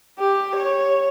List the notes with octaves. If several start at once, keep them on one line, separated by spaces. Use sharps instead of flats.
G4
C#5